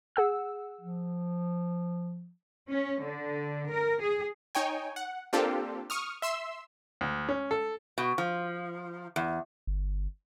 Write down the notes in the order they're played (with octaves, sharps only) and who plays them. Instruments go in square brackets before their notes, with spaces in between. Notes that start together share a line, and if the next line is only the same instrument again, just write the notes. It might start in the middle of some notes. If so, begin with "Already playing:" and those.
[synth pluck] G#4 F#5 E6
[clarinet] F3
[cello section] C#4
D3
A#4
G#4
[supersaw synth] D#4 C#5 G5 G#5
F#5
A#3 C4 D4 F4 G4 A4
C#6 D#6 F6
E5 C6 E6
[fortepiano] D2
C#4
A4
[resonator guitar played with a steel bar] B2
F3
E2
[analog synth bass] G1